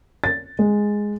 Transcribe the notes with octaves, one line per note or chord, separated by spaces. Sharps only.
A6
G#3